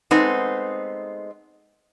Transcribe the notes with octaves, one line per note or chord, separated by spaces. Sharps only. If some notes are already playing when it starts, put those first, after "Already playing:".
G#3 A3 B3 C4 D#4